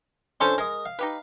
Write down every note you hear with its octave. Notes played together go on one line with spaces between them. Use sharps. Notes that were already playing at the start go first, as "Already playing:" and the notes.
F3 C#4 D4 A4 C5 C6
G#3 A#4 D#5
F5
D#4 G4 B4